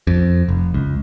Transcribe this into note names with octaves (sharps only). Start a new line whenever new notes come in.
F2
F1
C#2